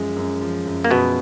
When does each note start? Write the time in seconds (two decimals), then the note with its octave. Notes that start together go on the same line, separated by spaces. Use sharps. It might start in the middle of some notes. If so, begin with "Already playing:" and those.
Already playing: F#2 F3 G#3
0.16 F#2
0.41 F3
0.66 F#2
0.84 A#3
0.91 F#2 B2 B3